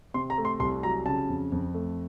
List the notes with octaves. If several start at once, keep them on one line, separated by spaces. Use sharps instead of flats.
C3 C6
A#5
A3
C6
C2 C6
F#3 A#5
C#3 A5
F2
F2
A3